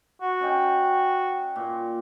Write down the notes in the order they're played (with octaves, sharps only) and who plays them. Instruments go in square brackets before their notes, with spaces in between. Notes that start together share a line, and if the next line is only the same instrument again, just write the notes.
[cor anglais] F#4
[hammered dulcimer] C#4 D#5 G5
A#2